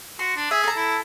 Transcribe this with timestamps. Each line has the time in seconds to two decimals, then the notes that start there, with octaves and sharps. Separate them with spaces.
0.19 F#4 C6
0.36 D4
0.51 G#4 E5
0.64 A4 A#5
0.76 E4